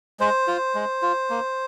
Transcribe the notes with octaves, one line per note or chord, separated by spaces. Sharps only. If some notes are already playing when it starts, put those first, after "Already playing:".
G#3 C5
F4
G#3
F4
A#3